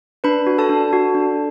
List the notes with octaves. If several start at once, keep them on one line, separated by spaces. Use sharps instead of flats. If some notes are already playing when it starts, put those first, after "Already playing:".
D4 B4 B5
F#4
A4 A5
D4
F#4
D4